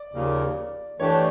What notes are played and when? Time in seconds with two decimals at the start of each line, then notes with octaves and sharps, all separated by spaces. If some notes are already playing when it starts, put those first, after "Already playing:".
Already playing: D5
0.13 D#2 C#3 F3 A#3
1.00 E3 A3 D4 G4 C#5